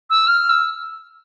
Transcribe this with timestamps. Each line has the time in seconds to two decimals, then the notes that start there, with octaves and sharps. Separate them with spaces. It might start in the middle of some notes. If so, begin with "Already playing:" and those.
0.10 E6
0.27 F6
0.49 E6